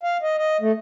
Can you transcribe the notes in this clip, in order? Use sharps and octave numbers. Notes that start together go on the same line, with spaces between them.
F5
D#5
D#5
A3